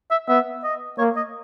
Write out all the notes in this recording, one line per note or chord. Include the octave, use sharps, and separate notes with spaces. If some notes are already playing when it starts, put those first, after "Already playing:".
E5
B3 E5
D#5
A#3 C#5
D#5